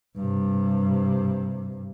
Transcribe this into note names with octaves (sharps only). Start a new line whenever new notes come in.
G2 C3